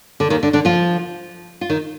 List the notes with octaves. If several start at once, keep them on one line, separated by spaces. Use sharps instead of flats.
D3
D#2 D#3
D3 D4
D3 D4
F3 F4
F4
D#3 D#4